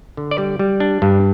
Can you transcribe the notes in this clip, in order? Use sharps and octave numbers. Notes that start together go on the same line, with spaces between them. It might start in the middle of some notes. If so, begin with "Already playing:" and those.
D3
D5
G3
G3
D4
G2